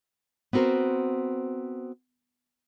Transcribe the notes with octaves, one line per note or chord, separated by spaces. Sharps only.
B3 C4 F#4 A#4 C5